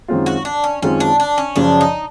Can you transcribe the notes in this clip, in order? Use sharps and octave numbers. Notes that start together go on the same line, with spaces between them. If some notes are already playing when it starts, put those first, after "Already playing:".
F#2 D#3 G#3 C4 F4
F#4
D4
C#4
F#2 D#3 G#3 C4 C#4 F4
D4
D4
C#4
F#2 C#3 F3 D4
D#4